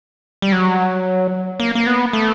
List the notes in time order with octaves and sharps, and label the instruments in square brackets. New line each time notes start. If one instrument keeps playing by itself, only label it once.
[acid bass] G3
F#3
A#3
A#3
B3
A3